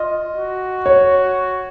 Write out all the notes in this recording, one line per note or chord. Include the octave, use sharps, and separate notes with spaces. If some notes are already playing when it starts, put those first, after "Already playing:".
Already playing: F4 D#5
F#4
C#5